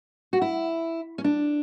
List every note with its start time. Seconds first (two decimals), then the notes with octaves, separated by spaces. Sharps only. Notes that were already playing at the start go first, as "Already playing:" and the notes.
0.33 F#4
0.41 E4
1.18 C#4
1.24 D4